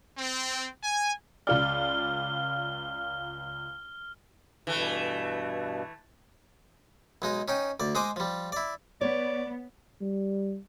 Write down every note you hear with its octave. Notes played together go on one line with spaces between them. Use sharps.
C4
G#5
C#2 F4 D5 F6 G7
G2 B2 E3 A3
B1 G#3 D#4
C#4 D#4 G5
D2 D5
G#3 G#4 C5 D#5 D6
F3 G3
E4 D5
B3 C#5 D5
G3